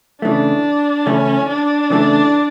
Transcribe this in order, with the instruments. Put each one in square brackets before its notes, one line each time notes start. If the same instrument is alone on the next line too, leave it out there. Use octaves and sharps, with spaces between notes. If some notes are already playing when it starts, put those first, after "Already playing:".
[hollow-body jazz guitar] C#3 E3 A3 [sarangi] D4
[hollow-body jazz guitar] C#3 E3 A3 [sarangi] C#4
[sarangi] D4
[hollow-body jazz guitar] C#3 E3 A3